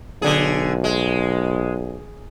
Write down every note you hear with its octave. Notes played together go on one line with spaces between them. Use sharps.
B1 D3 G#4
G#3